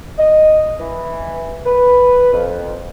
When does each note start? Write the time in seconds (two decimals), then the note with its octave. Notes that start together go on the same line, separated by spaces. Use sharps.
0.18 D#5
0.80 E3
1.65 B4
2.33 F2